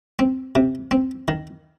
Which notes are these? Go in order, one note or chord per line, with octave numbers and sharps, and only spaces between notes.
C4
C3
C4
D#3